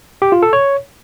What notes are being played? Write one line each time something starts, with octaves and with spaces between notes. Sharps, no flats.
G4
F4
A4
C#5